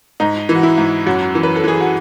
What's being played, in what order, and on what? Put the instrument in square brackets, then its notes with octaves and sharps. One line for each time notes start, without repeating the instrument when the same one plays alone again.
[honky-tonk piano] G#2 D#4
E3
F#4
E4
G#2
F#2 F#4
E3
B4
A4
E3 G#4
F#4